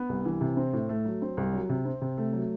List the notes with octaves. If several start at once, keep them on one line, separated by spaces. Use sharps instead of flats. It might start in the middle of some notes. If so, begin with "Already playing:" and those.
Already playing: B3
C2
E3
C3
C4
A2
A3
F#3
C4
C2
F#3
C3
C4
C3
A3
F#3